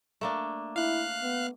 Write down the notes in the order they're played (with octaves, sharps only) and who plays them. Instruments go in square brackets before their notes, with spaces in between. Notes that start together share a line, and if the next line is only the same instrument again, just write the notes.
[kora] A3 A#3 D4
[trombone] E4 [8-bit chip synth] F5 F#6
[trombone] B3